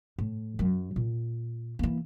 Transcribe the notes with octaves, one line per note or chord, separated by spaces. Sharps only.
A2
F#2 F#3
A#2
E3 A#3